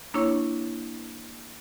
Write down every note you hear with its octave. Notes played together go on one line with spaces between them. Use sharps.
A#3 D4 E4 C#5 C#6